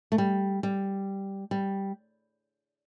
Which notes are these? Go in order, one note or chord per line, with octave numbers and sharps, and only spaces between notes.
A3
G3
G3
G3